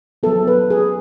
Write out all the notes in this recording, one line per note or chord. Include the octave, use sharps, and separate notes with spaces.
F#3 B3 A4
B4
G#4